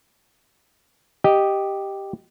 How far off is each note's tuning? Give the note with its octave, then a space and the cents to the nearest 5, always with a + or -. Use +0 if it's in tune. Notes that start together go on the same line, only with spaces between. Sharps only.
G4 +0 D#5 +0